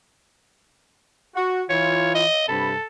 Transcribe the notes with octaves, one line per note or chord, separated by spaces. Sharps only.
F#4
E3 F4 C#5
D#5
G2 C3 A4 B5